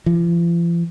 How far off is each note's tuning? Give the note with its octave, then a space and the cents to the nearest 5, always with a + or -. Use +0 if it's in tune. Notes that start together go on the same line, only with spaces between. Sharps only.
F3 -45